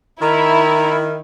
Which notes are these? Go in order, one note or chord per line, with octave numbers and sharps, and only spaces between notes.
D#3 E4 A#5